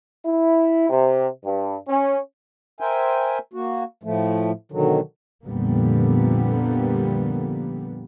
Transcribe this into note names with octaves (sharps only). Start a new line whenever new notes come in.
E4
C3
G2
C#4
A#4 C5 E5 G5 G#5
A#3 F#4
A2 F3 A3
B2 D3 D#3 F#3
F2 A#2 D3 G3 A#3 B3